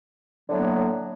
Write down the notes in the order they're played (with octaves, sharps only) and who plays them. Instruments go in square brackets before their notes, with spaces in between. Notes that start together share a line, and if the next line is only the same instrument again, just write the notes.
[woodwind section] A2 D3 F#3 A#3 B3